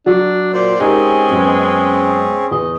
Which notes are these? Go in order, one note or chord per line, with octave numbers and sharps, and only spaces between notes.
F#3 D4
A#2 C5 D5
G#3 C4 C#4 D#4 G4 G#4 A#4
F#2 B3
E2 D#5